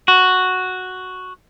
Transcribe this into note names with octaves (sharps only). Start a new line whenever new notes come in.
F#4